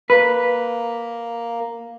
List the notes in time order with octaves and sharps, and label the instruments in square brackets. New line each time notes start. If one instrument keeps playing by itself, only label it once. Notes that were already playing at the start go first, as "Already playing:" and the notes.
[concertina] A#3 [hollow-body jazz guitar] B4